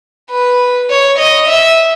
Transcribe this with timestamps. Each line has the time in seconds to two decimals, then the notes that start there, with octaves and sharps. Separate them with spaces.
0.30 B4
0.90 C#5
1.19 D#5
1.48 E5